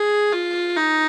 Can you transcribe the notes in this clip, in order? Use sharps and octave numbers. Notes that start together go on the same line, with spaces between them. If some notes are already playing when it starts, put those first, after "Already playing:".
Already playing: G#4
F4
D#4